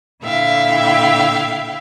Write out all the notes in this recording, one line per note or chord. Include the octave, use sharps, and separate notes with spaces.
A#2 D3 E4 E5 F5 G5